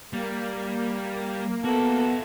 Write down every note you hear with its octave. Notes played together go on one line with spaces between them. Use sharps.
G3 A#3
B3 E4 F#4 A4